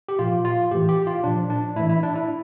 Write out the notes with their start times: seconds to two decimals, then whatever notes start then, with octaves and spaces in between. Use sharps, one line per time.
0.09 G4
0.19 A#2 F3 F4
0.45 F4
0.71 A2 E3 G4
0.89 G4
1.07 F4
1.24 A#2 F3 D4
1.50 D4
1.76 A2 E3 E4
1.89 E4
2.03 D4
2.16 E4